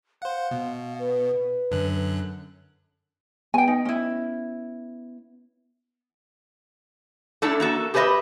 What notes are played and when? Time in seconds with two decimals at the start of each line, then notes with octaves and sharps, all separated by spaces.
0.22 C5 F5 F#5
0.51 B2
0.99 B4
1.71 F#2 D3 F#6
3.54 B3 G5 G#5
3.68 D#4
3.85 C#4 E4
7.42 A3 C#4 D4 E4 A4
7.60 A#3 F#4 A4
7.94 G4 G#4 B4 C5 D#5 E5